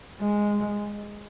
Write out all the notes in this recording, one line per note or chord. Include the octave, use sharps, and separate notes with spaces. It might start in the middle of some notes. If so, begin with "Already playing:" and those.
G#3